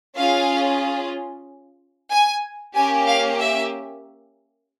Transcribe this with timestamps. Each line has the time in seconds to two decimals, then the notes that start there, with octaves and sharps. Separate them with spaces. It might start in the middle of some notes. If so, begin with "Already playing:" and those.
0.16 C#4 F4 G#4 F5
2.10 G#5
2.74 A#3 C#4 G4 G#5
3.06 F5
3.39 E5